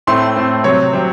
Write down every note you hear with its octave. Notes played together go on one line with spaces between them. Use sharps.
A2 A3 C4 C6
A2 A3 C4
C3 F#3 C4 C#5
C3 F#3 C4